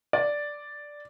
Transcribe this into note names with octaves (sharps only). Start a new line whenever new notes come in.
D5